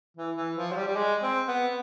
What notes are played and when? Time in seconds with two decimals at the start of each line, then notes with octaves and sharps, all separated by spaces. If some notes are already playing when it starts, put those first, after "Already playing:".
0.17 E3
0.36 E3
0.56 F3
0.72 F#3
0.76 G3
0.87 G3
0.96 G#3
1.23 C4
1.48 B3